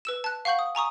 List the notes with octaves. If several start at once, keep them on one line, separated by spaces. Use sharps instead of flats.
B4 E6 E7
A5 F#6
F5 F#5 C#6 G6 F#7
D#6
G#5 A#5 C#6 D#6